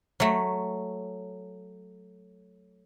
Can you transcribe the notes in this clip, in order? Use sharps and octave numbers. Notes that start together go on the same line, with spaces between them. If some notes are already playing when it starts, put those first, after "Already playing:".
F#3 A3